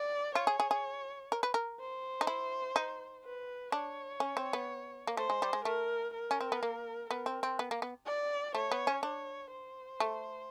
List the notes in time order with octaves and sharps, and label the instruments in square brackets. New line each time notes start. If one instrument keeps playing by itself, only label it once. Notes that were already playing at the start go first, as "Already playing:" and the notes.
Already playing: [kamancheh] D5
[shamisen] F4 [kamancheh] C#5
[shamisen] G#4
G#4
G#4
A#4
B4
A#4
[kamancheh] C5
[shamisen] D#4
E4
D#4
[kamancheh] B4
[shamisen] D4 [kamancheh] C#5
[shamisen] C#4
C4
B3
A#3
[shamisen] A3 [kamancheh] C5
[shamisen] G#3
G3
G#3
[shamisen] A3 [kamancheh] A#4
[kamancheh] A#4
[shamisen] C#4
C4
B3
A#3
[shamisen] B3 [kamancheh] A#4
[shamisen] C4
C4
B3
A#3
B3
[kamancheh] D5
[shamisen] A3 [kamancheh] C#5
[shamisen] B3
C#4
[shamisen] D4 [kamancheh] C#5
[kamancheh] C5
[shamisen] A3